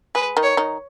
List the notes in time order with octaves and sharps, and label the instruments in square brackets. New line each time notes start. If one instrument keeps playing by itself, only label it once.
[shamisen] G#3 G#4 [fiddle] B4
[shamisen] D#3 D#4
[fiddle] C#5
[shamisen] D#3 D#4